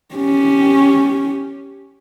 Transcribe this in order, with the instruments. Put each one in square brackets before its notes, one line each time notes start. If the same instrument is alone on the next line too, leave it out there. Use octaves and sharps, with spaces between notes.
[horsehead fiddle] C#4 G4